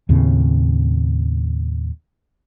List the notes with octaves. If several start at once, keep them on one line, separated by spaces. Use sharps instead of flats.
D#2 A2 C#3 C4